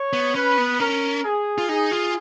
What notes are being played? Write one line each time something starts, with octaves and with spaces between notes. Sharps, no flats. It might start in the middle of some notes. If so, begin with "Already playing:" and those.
Already playing: C#5
B3
C#4 B4
B3
C#4 A#4
G#4
F4
D#4 G#4
F4